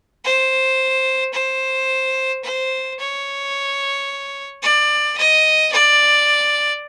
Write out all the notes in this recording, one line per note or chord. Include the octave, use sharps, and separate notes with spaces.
C5
C5
C5
C#5
D5
D#5
D5